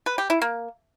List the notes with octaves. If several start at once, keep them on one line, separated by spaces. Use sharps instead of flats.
B4
G4
E4
A#3